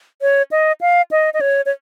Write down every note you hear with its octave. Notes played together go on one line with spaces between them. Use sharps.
C#5
D#5
F5
D#5
D#5
C#5
C#5